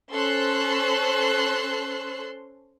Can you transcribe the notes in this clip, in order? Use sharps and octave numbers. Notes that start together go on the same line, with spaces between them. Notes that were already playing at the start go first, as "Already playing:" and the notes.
C#4 A4 C5 C6 E6 F#6